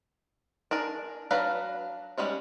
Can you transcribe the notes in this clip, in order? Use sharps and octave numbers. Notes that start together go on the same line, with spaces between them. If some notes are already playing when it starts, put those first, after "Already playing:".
D4 G#4 A#4
F#3 D4 B4 F5 A#5
G3 G#3 C#4 C#5